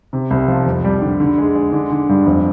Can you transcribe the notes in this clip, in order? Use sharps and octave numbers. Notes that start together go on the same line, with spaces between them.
C3
C2
F3
F2
G3
D3
D3
G#3
G#3
D3
D3
G2
F2